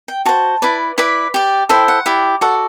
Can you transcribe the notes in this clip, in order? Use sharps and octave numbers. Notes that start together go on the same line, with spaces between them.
G5
F#4 C5 A5
E4 B4 D5
E4 B4 D5 B5
G4 D5
E4 A4 C5 G5
F#5
E4 G4 D5
F#4 A4 D5 F#5